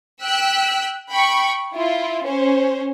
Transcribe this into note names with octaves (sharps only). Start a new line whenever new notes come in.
G5 E6 F#6 B6
G5 B5 C#6
E4 F4
C#4 C5